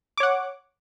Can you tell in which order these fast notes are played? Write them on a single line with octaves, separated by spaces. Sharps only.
D6 C#5 F#5